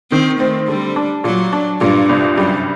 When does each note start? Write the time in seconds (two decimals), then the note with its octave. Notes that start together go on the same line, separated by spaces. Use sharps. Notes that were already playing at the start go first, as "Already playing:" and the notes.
0.11 D#3 C4
0.40 A3 C4
0.68 D3 G3
0.96 D4
1.24 A#2 F#3
1.53 D4
1.81 G2 A#2
2.09 C2
2.37 F#2 G3